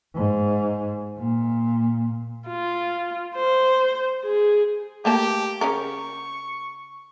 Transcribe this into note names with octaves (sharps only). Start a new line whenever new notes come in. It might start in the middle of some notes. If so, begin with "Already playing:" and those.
G#2
A#2
F4
C5
G#4
A3 A#3 G4 A5
C#3 C#4 A#4 C#6